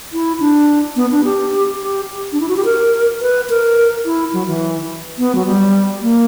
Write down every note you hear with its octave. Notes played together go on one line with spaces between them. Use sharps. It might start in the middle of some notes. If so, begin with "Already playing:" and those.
E4
D4
B3
D4
G4
G4
D4
E4
F#4
G4
A#4
B4
A#4
E4
F#3
E3
B3
F#3
G3
A#3